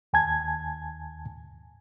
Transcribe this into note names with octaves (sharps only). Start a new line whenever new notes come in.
D#2 G#5 A5 G#6